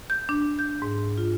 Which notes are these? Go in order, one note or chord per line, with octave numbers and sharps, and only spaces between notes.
G6
D4
G6
G#2
F4